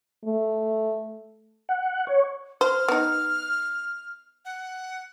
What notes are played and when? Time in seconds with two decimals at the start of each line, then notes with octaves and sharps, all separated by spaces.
0.25 A3
1.69 F#5
2.07 C#5
2.61 C5 F6
2.88 B3 D#4
4.45 F#5